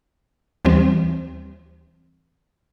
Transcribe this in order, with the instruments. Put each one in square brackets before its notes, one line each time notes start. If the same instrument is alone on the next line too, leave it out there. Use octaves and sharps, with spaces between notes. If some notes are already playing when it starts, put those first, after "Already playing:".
[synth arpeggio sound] D#2 E3 G3 C4